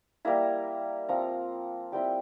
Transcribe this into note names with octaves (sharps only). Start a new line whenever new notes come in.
G3 A#3 E4 A#5
F3 C4 F4 A#5
G3 C4 E4 G5